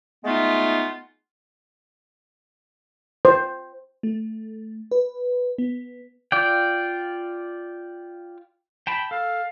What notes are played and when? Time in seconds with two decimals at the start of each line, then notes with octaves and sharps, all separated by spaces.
0.25 G#3 A3 B3 D#4 F4
3.25 C5
4.03 A3
4.91 B4
5.58 B3
6.32 F4 D5 G5
8.87 G5 A5 B5
9.11 A4 F5